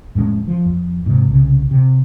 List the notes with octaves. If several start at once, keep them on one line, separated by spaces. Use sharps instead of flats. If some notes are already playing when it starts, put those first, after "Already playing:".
F2 A2 G#3 C#4
F3
F2
G#2 C3
C2 C#3
C3